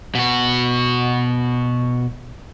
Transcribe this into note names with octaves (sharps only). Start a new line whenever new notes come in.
B2 F#4